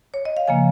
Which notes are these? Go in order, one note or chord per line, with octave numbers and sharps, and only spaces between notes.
C#5
D#5
F5
C#3 F3 A#3 G#5